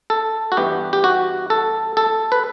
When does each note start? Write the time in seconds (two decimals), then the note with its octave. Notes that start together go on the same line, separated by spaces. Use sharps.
0.10 A4
0.52 F#4
0.57 G2 E3 B3 G4
0.93 G4
1.04 F#4
1.50 A4
1.97 A4
2.32 B4